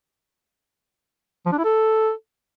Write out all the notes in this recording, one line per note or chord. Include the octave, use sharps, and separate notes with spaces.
F3
D4
E4
A4